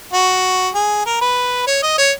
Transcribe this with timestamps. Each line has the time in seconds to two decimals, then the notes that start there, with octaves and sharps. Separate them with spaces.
0.14 F#4
0.75 G#4
1.06 A#4
1.21 B4
1.67 C#5
1.83 D#5
1.98 C#5